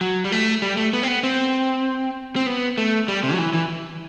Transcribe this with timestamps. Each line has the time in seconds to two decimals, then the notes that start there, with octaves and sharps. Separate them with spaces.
0.01 F#3
0.24 G3
0.32 A3
0.62 G3
0.77 A3
0.93 B3
1.03 C4
1.08 B3
1.23 C4
2.36 C4
2.46 B3
2.78 A3
3.08 G3
3.23 C3
3.33 F#3
3.38 E3
3.53 E3